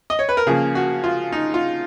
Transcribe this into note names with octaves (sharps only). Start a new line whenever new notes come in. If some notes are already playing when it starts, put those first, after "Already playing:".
D#5
C#5
B4
A#4
C#3 F3 A#3 G#4
F#4
F4
D#4
F4